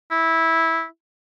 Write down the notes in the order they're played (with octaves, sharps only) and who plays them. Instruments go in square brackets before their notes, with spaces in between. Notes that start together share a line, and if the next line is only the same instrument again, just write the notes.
[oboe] E4